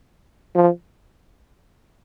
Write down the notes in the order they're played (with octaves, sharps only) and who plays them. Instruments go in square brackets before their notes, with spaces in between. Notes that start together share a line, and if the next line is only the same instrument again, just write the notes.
[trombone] F3